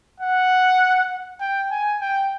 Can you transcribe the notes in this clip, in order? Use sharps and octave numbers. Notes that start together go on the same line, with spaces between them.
F#5
G5
G#5
G5